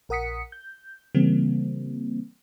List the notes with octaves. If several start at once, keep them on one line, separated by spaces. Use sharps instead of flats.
A#1 A#4 F#5 D#6 B6 C#7
G6
C#3 E3 G3 A#3 C4